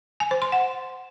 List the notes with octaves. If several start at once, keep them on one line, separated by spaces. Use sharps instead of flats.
G#5
C5
C6
F#5